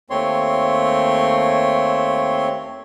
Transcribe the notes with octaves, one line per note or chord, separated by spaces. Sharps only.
D#2 A3 C4 C#5 C6